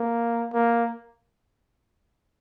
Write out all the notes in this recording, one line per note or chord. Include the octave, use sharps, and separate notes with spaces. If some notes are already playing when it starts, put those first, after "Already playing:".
Already playing: A#3
A#3